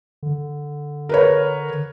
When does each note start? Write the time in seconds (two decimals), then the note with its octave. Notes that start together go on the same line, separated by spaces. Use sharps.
0.23 D3
1.09 A#4 B4 C#5